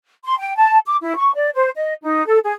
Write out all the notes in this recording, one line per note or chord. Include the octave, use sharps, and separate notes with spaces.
C6
G5
A5
D6
E4
C#6
D5
C5
D#5
D#4
A4
G#4